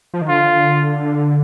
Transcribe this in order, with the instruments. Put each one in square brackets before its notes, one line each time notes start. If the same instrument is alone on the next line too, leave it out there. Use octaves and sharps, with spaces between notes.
[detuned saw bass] F3
D#3
[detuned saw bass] D3 [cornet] F4